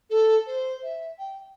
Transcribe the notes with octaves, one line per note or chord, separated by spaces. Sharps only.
A4
C5
E5
G5